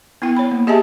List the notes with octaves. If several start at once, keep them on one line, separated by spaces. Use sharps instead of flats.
B3 E4 G5
C#5 B5
A#3
G4 G#4 D#5 E5 G#5 A5